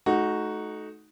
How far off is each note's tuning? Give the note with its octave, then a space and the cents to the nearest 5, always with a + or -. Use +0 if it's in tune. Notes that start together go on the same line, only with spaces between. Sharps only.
A3 -30 D#4 +0 F#4 +0